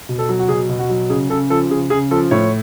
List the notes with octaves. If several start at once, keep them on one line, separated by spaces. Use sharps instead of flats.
B2
A4
F#3
F#4
B2 G#4
B2
F#4
F#3
C#3 G#4
C#3 A4
F3 A4
C#3 G#4
C#3 G#4
F3 A4
A2 C#5